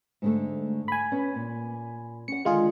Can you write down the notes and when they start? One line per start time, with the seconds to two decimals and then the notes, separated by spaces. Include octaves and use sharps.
0.22 G#2 D3 A3
0.88 G#5 B5
1.12 B3 C#4
1.35 A#2
2.28 C#4 F#5 C#7
2.45 D3 D#3 G#3 F4 G#4